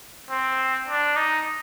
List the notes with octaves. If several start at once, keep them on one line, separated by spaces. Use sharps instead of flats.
C4
D4
D#4